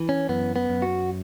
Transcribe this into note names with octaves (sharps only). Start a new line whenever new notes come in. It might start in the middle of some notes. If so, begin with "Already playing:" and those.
Already playing: E3
C#4
F#2 B3
B3
F#2
F#4